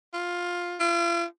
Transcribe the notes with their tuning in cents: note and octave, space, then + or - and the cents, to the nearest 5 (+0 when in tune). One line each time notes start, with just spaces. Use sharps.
F4 +10
F4 -40